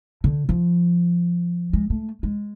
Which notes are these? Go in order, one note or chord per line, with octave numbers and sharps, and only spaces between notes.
D3
F3
G#3
A3
G#3